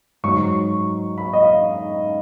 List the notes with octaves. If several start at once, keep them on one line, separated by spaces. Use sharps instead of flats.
G#2 F#3 C#6
B5
D#5
F5